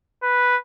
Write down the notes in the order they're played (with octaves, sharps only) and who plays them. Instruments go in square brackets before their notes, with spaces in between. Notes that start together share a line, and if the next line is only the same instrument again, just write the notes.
[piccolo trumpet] B4